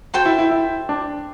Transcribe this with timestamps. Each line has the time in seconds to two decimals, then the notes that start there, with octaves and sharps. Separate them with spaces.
0.14 F#4 A4 C5 G5
0.25 E4
0.39 E4
0.51 E4
0.89 D4